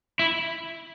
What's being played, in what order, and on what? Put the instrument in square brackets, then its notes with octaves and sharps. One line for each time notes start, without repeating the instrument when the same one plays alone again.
[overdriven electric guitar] E4